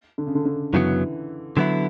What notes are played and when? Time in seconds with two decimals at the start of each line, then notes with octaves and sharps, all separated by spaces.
0.18 D3
0.27 C#3
0.35 D3
0.46 D3
0.73 F#2 C#3 E3 F#3 B3
1.57 D3 F#3 B3 E4